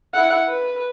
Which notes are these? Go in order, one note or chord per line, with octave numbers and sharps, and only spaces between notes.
E4 F#5
B4